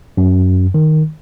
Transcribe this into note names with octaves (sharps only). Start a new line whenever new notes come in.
F#2
D#3